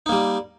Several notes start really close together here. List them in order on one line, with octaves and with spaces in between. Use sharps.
D#4 A#3 G3